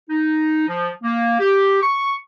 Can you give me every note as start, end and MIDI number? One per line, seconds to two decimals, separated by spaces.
0.10 0.65 63
0.68 0.91 53
1.03 1.38 58
1.40 1.79 67
1.82 2.14 85